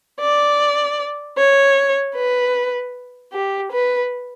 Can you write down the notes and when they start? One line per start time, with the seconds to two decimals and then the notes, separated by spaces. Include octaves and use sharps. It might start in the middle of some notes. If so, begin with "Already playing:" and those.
0.20 D5
1.38 C#5
2.15 B4
3.32 G4
3.72 B4